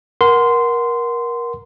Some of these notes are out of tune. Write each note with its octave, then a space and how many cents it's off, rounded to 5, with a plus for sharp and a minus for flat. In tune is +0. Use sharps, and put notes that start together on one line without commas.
A#4 +25 F#5 +0 C6 -15